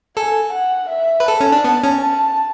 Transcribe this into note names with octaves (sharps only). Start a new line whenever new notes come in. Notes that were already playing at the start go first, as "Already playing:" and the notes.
A4 G#5
F#5
E5
B4
A4 A5
C#4
D4
B3
C#4
A5